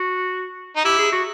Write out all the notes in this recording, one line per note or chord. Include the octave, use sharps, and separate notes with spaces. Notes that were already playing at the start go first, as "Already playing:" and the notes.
Already playing: F#4
D#4
E4 G4
G#4
F#4